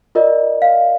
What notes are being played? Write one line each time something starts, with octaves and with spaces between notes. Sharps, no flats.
F4 A#4 D5 D#5
F5